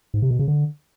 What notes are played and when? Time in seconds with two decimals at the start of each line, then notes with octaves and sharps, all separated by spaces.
0.14 G#2
0.22 C3
0.31 B2
0.39 C#3
0.48 D3